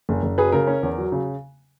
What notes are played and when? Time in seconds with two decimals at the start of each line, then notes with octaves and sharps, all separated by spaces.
0.09 F#1
0.23 F#1
0.38 F#3 G#4 B4
0.52 C#3 A#4
0.67 C#4
0.83 E2
0.98 F#3
1.12 C#3